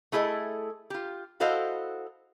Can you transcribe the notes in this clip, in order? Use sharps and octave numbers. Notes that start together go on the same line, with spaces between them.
A3 E4 G#4 A4 D#5
F4 G4
E4 F#4 A4 C5 D#5 F5